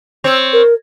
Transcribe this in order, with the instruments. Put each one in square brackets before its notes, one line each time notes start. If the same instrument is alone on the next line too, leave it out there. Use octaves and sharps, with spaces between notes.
[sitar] C4 C#5
[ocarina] A#4